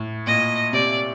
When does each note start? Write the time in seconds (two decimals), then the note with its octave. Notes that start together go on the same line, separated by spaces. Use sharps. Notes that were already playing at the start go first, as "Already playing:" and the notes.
Already playing: A2
0.27 A#2 D#5
0.73 C3 D5